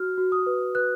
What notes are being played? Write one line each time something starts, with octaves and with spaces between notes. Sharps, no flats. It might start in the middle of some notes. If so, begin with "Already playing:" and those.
Already playing: F#4 F6
F#4
D#6
B4
B4 F#6